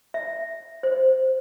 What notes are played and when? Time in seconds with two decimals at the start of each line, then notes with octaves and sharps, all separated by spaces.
0.14 E5
0.83 C5